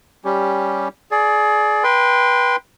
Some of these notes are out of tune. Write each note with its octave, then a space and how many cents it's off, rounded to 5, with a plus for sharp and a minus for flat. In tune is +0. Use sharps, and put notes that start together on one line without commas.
G3 +0 C#4 +0 G4 +0
G#4 +30 D5 +0
B4 -25 G5 +10 C6 -20